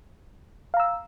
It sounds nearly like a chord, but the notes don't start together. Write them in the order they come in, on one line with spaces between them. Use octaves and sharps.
F5 A#5 E6